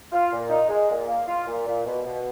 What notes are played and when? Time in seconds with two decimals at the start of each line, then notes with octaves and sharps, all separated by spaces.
0.12 F4
0.31 A#2
0.49 D#4
0.69 G#3
0.89 A#2
1.07 A#3
1.27 F4
1.46 A#2
1.66 A#2
1.85 B2
2.04 B2